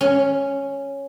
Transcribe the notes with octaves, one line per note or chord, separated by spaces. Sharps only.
C#4